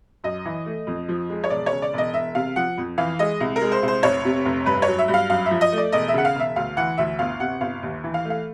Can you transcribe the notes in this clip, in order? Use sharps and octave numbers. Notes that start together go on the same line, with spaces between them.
F#2 D#5
E3
A3
F2
F3
G#3
C#5
E1 D5
C#5
C#3
D5
E1 D#5
E1 E5
C3 F5
F3 F#5
F2
E3 F5
G#3 D#5
C2
A#4
G#3
C5
C2
C5
F1 C#5
C3
F1
G2 B4
C#5
F#3
E5
G2
F5
F#2 F5
E5
F3
D#5
A3
D5
E1 D#5
E5
C#3 F#5
F5
E1 E5
D2 F5
E3 F#5
D2 E5
G1 F5
C3 F#5
G1 F5
D#2
E3
F5
A3
F5